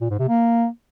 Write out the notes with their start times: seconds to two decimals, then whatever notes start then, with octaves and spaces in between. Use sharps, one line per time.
0.01 A#2
0.10 G#2
0.19 C3
0.28 A#3